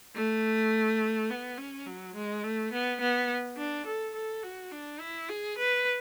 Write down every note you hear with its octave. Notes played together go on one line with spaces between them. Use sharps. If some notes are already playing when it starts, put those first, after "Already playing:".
A3
B3
C#4
F#3
G#3
A3
B3
B3
D4
A4
A4
F#4
D4
E4
G#4
B4